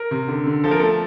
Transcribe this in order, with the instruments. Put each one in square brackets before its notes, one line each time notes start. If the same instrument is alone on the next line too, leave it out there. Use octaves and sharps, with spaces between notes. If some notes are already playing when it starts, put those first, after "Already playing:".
Already playing: [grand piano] A#4
C3
D3
D3
F3 A4
A#4
A3 A4